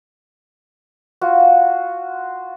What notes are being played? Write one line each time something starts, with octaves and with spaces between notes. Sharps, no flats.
F4 F#4